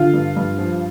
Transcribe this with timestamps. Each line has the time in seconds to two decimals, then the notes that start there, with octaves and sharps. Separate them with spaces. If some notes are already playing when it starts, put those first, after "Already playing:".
Already playing: D3 F4
0.14 G2
0.36 G2
0.58 F3